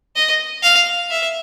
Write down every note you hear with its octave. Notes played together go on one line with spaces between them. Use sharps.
D#5
F5
E5